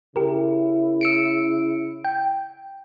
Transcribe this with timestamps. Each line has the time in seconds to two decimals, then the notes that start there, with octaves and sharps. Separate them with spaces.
0.16 C#3 E4 G4 A#4
1.01 E6 C#7 D7
2.05 G5